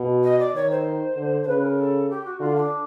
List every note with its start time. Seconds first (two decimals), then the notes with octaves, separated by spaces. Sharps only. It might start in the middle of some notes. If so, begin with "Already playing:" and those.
Already playing: B2
0.23 D#5
0.39 D5
0.55 D#3 C#5
0.70 C5
1.16 D3
1.42 C5
1.47 C#3 B4
1.62 A#4
1.78 A4
2.10 G4
2.25 F#4
2.40 D3 F4
2.56 D4